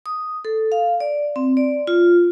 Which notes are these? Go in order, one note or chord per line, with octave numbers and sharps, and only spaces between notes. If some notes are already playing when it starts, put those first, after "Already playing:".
D#6
A4
F5
D5
C4
D5
F4